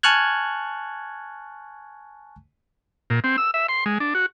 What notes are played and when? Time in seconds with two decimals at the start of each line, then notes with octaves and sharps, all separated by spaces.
0.03 G#5 A5 C#6 F6 F#6 G#6
3.10 A#2
3.24 C4
3.38 E6
3.54 E5
3.69 C6
3.86 G#3
4.00 D4
4.15 F#4